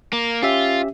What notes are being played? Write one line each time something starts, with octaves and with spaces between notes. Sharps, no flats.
A#3
C#4 F4 G4 E5